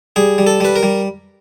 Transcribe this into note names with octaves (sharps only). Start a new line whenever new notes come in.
G3 G#4
G3
A4
G3 B4
A#4
G3